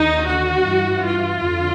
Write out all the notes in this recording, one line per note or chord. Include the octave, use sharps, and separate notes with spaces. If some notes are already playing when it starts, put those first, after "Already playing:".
Already playing: D#2 D3 D#4
F#4
G2 E3
F4
F2 D3